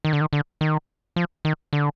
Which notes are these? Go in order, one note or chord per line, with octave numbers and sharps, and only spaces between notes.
D#3
D3
D#3
D3
D#3
F3
D#3
D3